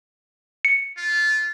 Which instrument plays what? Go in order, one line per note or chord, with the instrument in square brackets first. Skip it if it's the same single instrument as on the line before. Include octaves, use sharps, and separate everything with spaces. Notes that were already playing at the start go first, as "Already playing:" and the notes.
[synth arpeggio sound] C#7
[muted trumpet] F4